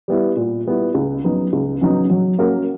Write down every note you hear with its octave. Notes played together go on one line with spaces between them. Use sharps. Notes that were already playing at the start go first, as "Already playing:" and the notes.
G3 B3 E4
A#2
G3 B3 E4
C#2
C#3 F#3 B3 D#4
C#2
C#3 F#3 B3 D#4
F#3
A#3 C#4 F#4 A#4